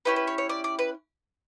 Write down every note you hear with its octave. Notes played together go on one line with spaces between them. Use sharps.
C#4 E4 G4 B4
B4
C#5
C#5
D5
D5
B4